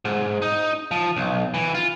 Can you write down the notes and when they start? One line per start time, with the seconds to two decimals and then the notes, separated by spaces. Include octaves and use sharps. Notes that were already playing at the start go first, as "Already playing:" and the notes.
0.05 G#2
0.42 D#4
0.91 F3
1.16 B1
1.54 E3
1.75 F4